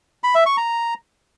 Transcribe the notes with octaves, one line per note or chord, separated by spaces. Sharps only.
B5
E5
C#6
A#5